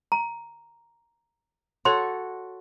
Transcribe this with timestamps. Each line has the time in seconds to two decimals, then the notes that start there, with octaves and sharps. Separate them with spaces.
0.12 A#5
1.85 F#4 A4 C#5 C6